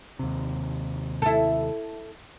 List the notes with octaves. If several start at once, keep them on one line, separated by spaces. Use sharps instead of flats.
D#2 C3
E4 A4